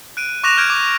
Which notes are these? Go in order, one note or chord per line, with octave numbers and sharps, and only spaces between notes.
F#6 D7 D#7
C#6 D6 F#6 A#6 E7 F7
F6 G6 G#6 D7
D6